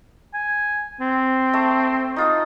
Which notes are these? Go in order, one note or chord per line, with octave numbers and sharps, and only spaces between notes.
G#5
C4
A3
D#4 F4 D#5